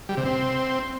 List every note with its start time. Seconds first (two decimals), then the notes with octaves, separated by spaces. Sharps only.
0.09 G3
0.17 C3
0.25 C4